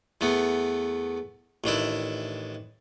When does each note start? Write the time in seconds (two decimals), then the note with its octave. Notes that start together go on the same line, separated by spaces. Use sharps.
0.21 E2 A3 B3
1.64 A1 D#3 D4 E4